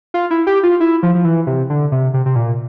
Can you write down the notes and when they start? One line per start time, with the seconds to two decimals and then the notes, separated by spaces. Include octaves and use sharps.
0.14 F4
0.31 E4
0.47 G4
0.63 F4
0.80 E4
1.03 F3
1.15 F3
1.25 E3
1.47 C3
1.70 D3
1.92 C3
2.14 C3
2.26 C3
2.36 A#2